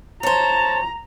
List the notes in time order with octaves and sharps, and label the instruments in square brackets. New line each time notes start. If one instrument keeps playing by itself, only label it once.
[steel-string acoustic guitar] C5 C#5 [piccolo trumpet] A5 [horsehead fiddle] A#5